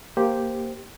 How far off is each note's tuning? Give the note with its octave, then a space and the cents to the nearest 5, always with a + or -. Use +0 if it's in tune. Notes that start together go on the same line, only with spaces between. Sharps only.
A#3 +0 G4 +0 C5 +0